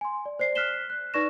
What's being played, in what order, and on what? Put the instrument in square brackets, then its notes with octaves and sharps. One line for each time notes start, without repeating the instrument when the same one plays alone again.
[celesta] G#5 C6
D5
C5 D5 C7
F6 F#6 B6 C7 E7 G7
F#6
D#4 B4 D5 C#6 A#6 E7